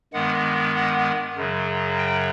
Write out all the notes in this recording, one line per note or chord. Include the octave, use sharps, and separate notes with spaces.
G2 D#3 G#3 B3 F#5
F#5
F#2 C#3 F#3
G5